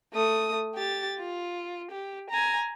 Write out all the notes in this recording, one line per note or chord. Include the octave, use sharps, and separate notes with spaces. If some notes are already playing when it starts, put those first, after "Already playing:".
A3 D#6
G4 A6
F4
G4
G#5 A#5